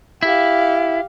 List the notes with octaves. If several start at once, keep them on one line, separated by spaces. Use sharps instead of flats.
E4 G4 F5